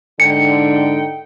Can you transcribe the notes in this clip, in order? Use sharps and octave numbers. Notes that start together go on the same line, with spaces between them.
G#2 D3 D#4 G5 C#7